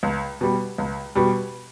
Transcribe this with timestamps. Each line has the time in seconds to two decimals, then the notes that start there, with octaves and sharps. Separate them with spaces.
0.03 C#2
0.41 B2 G3
0.78 C#2
1.15 B2 G3